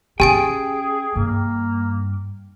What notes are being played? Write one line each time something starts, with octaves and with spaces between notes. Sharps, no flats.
C#4 G4 G#4 G5 G#5 D7
G2 A#3